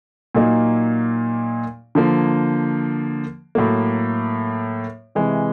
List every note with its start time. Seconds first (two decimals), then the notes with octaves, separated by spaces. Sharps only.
0.35 A#2 F#3 A#3 D#4
1.95 D3 F3 A#3
3.55 A2 F#3 A#3
5.15 C3 E3 G#3